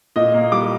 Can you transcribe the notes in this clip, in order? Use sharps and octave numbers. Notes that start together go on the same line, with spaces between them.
A#2 D#5
A#3
G3 D6